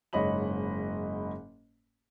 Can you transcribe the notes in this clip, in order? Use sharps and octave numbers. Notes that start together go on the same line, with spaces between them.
F#1 G#2 C#5 D#5 B5 F#7